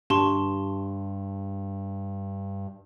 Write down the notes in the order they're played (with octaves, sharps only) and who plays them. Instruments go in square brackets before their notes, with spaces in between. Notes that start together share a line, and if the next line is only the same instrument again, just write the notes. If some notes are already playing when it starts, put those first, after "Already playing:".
[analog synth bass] G2 [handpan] D4 [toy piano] G4 [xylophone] A5 C6 C#6